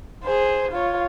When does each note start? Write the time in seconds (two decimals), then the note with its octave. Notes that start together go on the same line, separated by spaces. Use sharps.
0.24 G#4 C5
0.72 F4 C#5